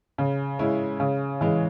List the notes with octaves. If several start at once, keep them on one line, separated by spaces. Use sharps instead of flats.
C#3
G#3 C#4 E4
C#3
E3 G#3